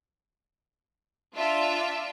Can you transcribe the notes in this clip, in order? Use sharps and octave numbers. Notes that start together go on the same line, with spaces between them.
D4 F4 E5